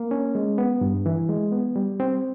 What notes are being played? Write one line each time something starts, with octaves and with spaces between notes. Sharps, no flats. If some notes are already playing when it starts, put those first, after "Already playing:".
Already playing: A#3
C#4
G#3
B3
G2
E3
G#3
B3
G3
C4